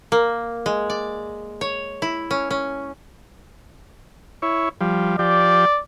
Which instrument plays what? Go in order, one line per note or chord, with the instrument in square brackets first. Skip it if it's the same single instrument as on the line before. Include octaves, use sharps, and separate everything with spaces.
[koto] A#3
G#3
D5
C#5
E4
C#4
C#4
[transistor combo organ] E4 C#5
F3 G3
[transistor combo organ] F3 G4 [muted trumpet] D5